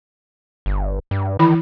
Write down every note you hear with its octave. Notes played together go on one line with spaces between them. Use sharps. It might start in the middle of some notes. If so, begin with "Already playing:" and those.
G1
G2
D#3 E3 E4 B5